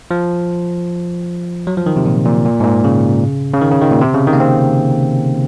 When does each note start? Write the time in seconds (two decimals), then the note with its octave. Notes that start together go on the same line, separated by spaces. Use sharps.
0.11 F3
1.67 F#3
1.77 F3
1.86 D#3
1.96 C3
2.06 A#2
2.26 A#2
2.45 A#2
2.60 G#2
2.64 A#2
2.84 C#3
3.54 C#3
3.62 D#3
3.72 C#3
3.81 D#3
3.91 A#2
4.01 C3
4.14 C#3
4.27 D#3
4.33 A#3
4.40 C4